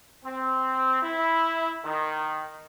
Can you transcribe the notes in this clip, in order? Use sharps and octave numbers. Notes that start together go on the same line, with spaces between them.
C4
E4
D#3